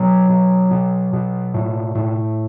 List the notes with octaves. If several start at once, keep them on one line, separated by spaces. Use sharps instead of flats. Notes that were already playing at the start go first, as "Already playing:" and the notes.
Already playing: B2 F#3
B2
B2
B2
A2
A2